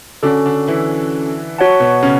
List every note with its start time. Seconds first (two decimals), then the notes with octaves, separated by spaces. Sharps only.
0.23 D3 C#4 D4 F#4 A4
0.45 D3 D4
0.68 E3 E4
1.58 F#4 C#5 F#5 A5
1.80 B2 B3
2.03 C#3 C#4